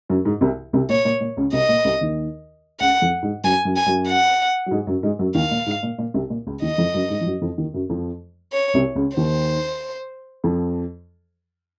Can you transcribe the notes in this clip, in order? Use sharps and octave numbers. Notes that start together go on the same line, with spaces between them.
F#2 F#3
G#2
C2 C3
C2 C3
A#2 C#5
A#2
A#2
C#2 C#3
C2 C3 D#5
A#2
C2 C3
D#2 D#3
C#2 C#3 F#5
F2 F3
G#2 G#3
F#2 F#3 G#5
F#2 F#3
G#5
F#2 F#3
F#5
F#3
G#2 G#3
F#2 F#3
G#2 G#3
F#2 F#3
D#2 D#3 F5
A#2
G#2
A#2
A#2
C2 C3
A#2
C#2 C#3
D#2 D#3 D#5
F2 F3
F#2 F#3
G#2 G#3
F3
F#2 F#3
F2 F3
D#2 D#3
F#2 F#3
F2 F3
C#5
C2 C3
C#2 C#3
D#2 D#3 C5
F2 F3